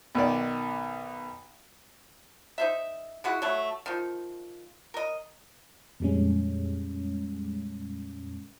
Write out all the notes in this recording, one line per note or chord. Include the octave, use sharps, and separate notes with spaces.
B1 D#3 D5
D#4 C5 E5
G#3 E4 F#4
F#3 A3
D#3 F3
A#4 D#5
F2 A#2 G3 G#3 C#4